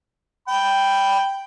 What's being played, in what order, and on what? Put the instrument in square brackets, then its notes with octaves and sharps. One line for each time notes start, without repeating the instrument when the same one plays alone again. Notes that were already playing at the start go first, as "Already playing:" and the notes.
[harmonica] G5 B5